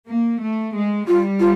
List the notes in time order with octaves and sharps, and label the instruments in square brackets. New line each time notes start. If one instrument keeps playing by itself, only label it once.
[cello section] A#3
A3
G#3
[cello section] G3 [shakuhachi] F4
[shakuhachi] F4